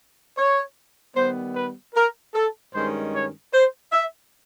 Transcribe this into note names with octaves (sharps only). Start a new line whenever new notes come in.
C#5
D#3 G3 B3 C5
B4
A#4
A4
G2 D#3 G#3 C#4 C5
C#5
C5
E5